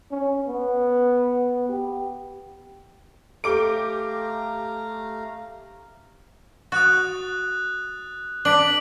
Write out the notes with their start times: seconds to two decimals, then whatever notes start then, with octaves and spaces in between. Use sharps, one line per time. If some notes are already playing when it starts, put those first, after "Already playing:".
0.11 C#4
0.47 B3
1.69 G4
3.44 A3 G4 A4 F5 A#5 D6 D7
6.72 F#4 D#6 F#6 A6
8.45 D4 B6 D7 F#7